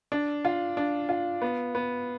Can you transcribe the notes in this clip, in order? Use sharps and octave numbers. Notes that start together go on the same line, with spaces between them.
D4
F4
D4
F4
B3
B3